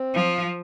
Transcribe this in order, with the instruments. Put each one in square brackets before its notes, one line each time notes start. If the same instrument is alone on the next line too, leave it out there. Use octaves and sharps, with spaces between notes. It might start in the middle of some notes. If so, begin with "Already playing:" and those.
Already playing: [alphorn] C4
[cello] F3